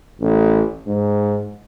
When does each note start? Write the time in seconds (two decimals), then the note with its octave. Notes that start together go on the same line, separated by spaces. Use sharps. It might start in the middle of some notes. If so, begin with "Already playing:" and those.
0.21 A1
0.87 G#2